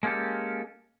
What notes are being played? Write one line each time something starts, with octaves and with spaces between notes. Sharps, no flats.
G#3 A#3 C#4 G4 A4